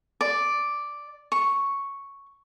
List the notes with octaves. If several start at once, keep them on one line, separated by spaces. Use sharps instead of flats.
D5
C#6